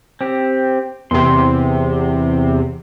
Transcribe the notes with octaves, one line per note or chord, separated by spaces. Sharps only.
C4 G4
E2 C3 C6